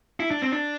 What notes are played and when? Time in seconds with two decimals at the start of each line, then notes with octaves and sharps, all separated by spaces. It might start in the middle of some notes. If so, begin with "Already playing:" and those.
0.20 E4
0.31 D4
0.42 C4
0.52 D4